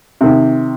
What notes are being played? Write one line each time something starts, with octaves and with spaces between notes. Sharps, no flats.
C3 D#3